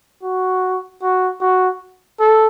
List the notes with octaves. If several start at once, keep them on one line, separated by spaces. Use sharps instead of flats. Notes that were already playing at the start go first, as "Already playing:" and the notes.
F#4
F#4
F#4
A4